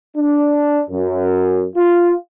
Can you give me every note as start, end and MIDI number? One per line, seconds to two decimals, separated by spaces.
0.16 0.82 62
0.90 1.66 42
1.76 2.14 65